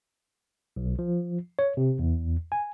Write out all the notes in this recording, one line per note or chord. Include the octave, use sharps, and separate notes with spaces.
B1
F3
C#5
C3
E2
G#5